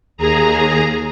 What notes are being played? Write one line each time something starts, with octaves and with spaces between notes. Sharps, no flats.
D#2 G#4 A#5